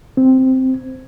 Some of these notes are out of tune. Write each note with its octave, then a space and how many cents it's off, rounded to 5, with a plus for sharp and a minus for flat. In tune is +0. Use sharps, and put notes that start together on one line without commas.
C4 -5